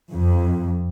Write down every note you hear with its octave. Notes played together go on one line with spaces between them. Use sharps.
F2